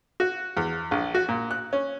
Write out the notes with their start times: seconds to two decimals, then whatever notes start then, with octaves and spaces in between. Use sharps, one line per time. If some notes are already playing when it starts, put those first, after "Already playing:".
0.20 F#4
0.57 E2
0.91 A#1
1.15 F#4
1.29 A#2
1.51 F#6
1.73 C#4